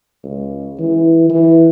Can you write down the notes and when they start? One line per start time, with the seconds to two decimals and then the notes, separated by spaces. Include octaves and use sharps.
0.24 C#2
0.79 E3
1.30 E3